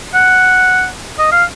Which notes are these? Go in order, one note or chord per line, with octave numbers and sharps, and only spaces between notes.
F#5
D#5
F5